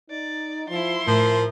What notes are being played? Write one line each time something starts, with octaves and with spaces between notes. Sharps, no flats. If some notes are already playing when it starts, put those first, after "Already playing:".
D#4 D5
F3 E4 C6
A2 F3 A#4